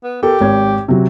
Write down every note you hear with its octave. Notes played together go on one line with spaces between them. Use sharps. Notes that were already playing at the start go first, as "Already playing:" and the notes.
B3
G4 A4 A#4
G#1 C#5 G#6
C3 F#3